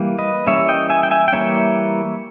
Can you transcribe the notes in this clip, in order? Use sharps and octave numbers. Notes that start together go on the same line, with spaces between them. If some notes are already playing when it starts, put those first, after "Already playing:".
Already playing: E3 G3 A#3
B4 D#5
E3 G3 A#3 C#4 C#5 E5
D#5 G5
E5 G#5
G5
E5 G#5
G5
E3 G3 A#3 C#4 C#5 E5